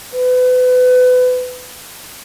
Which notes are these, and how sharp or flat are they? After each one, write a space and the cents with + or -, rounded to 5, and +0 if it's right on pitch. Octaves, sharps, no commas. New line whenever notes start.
B4 +30